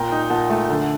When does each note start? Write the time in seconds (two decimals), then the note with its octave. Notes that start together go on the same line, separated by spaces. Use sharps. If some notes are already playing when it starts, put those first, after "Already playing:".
Already playing: A#2 G5 A#5
0.12 D#4
0.30 A#2 F#5 A5
0.50 A3
0.69 D3